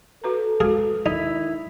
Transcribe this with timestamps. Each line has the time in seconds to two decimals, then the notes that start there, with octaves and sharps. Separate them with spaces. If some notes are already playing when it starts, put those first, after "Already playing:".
0.24 F#4 A4 B4 A#5
0.60 G#3 F#4 G#4
1.06 D#3 D#4 E4